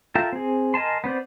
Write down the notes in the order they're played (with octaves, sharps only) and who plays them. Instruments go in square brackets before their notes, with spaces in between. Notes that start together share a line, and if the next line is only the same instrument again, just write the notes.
[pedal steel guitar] F4 A4 A#4 E5 G5
C4 G#4
A#4 D#5 G#5 A5 C6
B3 C4 C5 D5